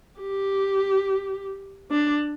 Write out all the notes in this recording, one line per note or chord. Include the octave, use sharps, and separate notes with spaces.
G4
D4